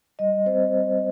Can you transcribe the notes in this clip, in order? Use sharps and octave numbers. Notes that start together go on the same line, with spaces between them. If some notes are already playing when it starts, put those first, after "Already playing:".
G3 D#5
C4 C5
G3